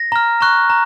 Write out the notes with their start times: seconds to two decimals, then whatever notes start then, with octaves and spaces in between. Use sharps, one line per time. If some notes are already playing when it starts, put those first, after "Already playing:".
Already playing: A#6
0.12 A#5 F6
0.41 A#5 C#6 F#6
0.70 A#5